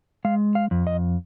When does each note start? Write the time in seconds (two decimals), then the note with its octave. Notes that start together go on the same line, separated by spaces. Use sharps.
0.25 G#3 F5
0.55 F5
0.71 F2
0.87 D#5